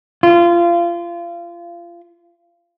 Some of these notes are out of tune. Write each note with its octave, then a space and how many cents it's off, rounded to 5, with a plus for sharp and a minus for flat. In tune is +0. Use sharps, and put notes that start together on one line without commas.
F4 -25